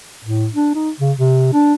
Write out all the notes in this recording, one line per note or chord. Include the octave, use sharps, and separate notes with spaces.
A2
D4
D#4
C#3
C3
D4